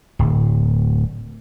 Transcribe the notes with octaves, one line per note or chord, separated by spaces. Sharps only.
D1